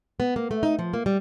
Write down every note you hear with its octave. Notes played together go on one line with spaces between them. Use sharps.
B3
A#3
A3
D#4
F3
A#3
G3